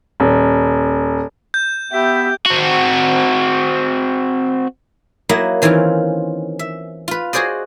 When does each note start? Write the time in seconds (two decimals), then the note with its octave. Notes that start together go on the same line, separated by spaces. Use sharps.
0.20 D#1
1.54 G6
1.92 B3 G4 E5
2.46 C4 F#4
5.29 F#3 A#3 E4 D#5 E5 F#5
5.62 D#3 E3 C4 C#4 F4
6.59 E5
7.08 F4 B4
7.33 F#4 G#4 C5 D5 D#5